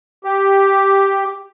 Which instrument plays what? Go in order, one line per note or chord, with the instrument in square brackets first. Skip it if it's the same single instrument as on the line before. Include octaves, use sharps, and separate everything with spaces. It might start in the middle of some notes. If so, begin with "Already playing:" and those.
[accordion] G4